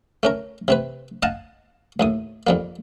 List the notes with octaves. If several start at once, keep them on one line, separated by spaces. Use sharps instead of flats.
A3 C#4 A#4
C3 C4 B4
D#5 F5 F#5 G#5 A5
D#2 A2 D#6
F2 G3 A#3